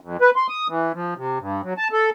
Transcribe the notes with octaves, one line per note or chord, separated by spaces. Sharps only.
F2
B4
C6
D#6
E3
F3
C3
G2
F#3
A5
A4